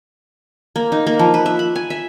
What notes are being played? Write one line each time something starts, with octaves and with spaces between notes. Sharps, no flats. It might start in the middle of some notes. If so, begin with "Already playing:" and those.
A#3
D#4
A#3
F3
B4
E5
B5
G#5
E5